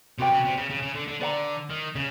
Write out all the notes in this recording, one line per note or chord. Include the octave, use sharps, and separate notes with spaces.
C3 F#4 B4 D5 G5
C#3
C3
C#3
C#3
C#3
D3
D3
D3 B4 D5 F#5 A#5
D#3
C#3